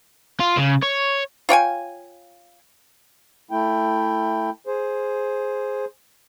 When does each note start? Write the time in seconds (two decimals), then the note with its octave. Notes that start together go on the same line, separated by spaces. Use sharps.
0.40 F4
0.57 C#3
0.83 C#5
1.49 F4 C#5 G5 G#5
3.51 A3 E4 G5
4.67 G#4 C5